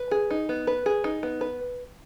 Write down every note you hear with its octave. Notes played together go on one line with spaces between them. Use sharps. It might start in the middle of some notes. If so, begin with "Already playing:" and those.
Already playing: B4
G#4
D#4
B3
B4
G#4
D#4
B3
B4